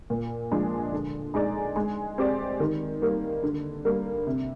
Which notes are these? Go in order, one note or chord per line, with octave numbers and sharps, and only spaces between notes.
A#2
F3 G#3 D4
D3
G#3 D#4 G#4 D5
G#3
C4 G4 D5
D#3
G3 A#3
D3
G3 A#3
C3